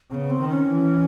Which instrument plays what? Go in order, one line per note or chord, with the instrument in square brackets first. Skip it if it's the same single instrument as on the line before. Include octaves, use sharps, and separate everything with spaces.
[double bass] C#3 [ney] B3 C4
[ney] C4
[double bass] D#3
[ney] C#4
[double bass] E3